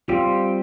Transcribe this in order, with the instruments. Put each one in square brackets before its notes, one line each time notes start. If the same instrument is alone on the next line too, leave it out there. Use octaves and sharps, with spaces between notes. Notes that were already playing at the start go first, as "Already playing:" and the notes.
[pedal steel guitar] G3 C4 G4 [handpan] F4